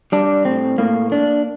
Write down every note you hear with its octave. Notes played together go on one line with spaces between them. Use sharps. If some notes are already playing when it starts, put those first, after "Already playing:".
G3 D4
A2 C4
A2 A#3
A#3 D4